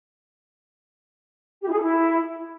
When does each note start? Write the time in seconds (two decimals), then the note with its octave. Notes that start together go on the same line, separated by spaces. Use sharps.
1.62 G4
1.67 E4
1.72 G#4
1.77 A4
1.82 E4